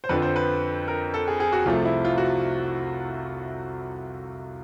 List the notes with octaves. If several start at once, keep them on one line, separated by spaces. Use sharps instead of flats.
C5
F2 D3 F3 B4
C5
B4
A#4
A4
G#4
G#4
F#4
C2 C3 F3 A3 F4
E4
F4
F#4